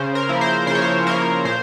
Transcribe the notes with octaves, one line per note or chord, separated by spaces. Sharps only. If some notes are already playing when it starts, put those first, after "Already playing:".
Already playing: C#3 C5
A#4
F3 A#3 E4
C5
C#3 C5
C#5
C5
F3 A#3 E4 A#4
A#2 C5